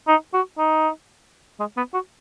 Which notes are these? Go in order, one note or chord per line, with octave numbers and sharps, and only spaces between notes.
D#4
F#4
D#4
G#3
B3
F#4